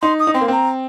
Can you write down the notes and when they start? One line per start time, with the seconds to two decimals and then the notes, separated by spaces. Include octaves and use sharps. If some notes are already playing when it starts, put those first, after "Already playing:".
0.02 D#4 C6
0.19 D#6
0.27 D#4
0.34 C4 C6
0.41 A#3
0.48 C4 A#5